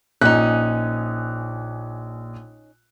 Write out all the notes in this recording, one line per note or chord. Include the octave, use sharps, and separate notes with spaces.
A#1 C#4 D#4 F#6